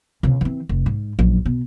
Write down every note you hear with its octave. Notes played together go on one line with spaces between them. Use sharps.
C#2 C3
E3 C4
F1
G#2
A#1 F#2
B2